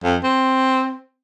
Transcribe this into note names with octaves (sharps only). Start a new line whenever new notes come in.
F2
C4